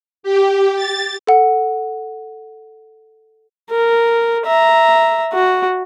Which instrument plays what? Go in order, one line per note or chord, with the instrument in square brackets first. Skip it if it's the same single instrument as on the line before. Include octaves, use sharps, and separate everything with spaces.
[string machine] G4
A6
[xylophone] A4 F#5
[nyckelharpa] A#4
E5 A#5
F#4